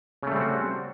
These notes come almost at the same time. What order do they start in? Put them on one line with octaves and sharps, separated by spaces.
C#3 A3 G3 C4 F#4